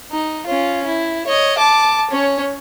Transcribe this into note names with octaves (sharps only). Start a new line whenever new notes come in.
D#4
C#4 F4
E4
C#5 D#5
A5 D6
C#4 C#5